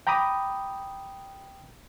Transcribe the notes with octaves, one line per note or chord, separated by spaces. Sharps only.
G5 A#5 B5 D6 D#6